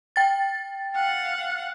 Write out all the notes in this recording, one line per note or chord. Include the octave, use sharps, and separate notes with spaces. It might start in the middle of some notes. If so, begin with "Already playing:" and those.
G5 A6
F5 F#5